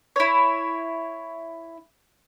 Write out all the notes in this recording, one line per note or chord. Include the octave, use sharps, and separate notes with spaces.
E4 C#5